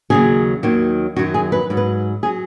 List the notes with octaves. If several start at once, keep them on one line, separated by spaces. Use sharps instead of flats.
D#2 C#3 F#3 G#4
D#2 D#3 F#3
F#2 D#3 F#3 F#4
G#4
B4
G#2 F#3
B4
F#3 G#4